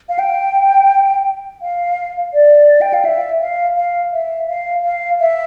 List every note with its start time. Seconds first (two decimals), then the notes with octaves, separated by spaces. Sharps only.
0.09 F5
0.19 G5
1.62 F5
2.34 D5
2.81 G5
2.93 F5
3.05 E5
3.41 F5
3.77 F5
4.13 E5
4.49 F5
4.85 F5
5.20 E5